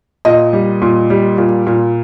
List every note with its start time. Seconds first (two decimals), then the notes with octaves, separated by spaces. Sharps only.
0.25 A#2 D#5
0.53 G3
0.82 A#2
1.10 G3
1.38 A#2
1.67 A#2